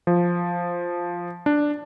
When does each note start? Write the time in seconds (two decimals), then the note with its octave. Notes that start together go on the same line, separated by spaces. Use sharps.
0.07 F3
1.46 D4